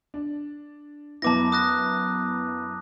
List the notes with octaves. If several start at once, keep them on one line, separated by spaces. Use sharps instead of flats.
D4
F#2 B3 E4 A5 D6 A#6
D#6 F#6 A#6